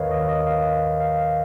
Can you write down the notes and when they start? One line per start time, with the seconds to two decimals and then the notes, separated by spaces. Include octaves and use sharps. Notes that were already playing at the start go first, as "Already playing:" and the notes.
Already playing: D#2 D#3 A#4 B4 C#5 D#5 F5
0.11 D#5
0.29 D#5
0.47 F5
1.00 F5
1.18 F5